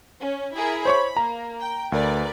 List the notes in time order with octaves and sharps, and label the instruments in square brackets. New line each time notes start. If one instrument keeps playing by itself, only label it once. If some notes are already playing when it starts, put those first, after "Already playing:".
[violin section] C#4
E4 G#4 A#4
[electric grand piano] C5 C#5 C#6 [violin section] B5
[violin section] A#3 [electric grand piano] A#5
[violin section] G5
[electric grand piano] D2 [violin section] A#4 B4 D5